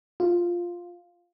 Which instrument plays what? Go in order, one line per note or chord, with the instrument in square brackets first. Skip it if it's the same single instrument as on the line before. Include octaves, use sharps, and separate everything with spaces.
[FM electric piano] F4